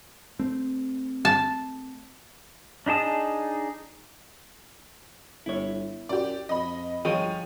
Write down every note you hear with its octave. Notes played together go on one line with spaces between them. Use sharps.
A3 C4
A5
D4 D#4 G#4 A5 D#6
G1 E4 C#5
F#2 G4 D5
F2 D#5 B5
G1 F3 G#4 C#5 D#5 G5 D#7